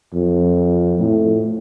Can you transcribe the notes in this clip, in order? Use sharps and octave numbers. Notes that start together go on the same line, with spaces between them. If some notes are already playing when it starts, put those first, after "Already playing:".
F2
A2